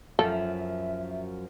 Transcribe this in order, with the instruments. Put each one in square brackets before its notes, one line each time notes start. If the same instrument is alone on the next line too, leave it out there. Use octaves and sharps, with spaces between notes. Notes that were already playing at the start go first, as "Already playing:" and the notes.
[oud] F#2 F3 [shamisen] A4 [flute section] E5